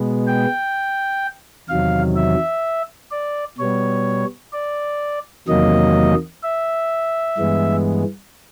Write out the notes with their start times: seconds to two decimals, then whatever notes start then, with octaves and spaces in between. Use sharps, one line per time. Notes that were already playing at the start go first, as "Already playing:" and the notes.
Already playing: B2 G#3 B3
0.27 G5
1.69 E2 C3 D#3 F#3 F5
2.16 E5
3.12 D5
3.58 B2 G3 B3 C#5
4.53 D5
5.48 E2 C3 D#3 F#3 A#3 D#5
6.43 E5
7.38 G2 E3 G#3 B3